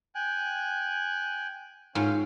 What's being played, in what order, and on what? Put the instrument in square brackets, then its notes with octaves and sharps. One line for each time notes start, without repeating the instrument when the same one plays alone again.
[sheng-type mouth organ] G5 G#5 F#6
[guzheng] G#2 F4 G5 [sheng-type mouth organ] C#4 F5